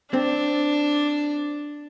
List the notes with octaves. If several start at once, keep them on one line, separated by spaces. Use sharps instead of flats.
C4 D4